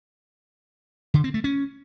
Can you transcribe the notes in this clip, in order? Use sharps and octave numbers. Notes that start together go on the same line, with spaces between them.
D3
C4
A3
C#4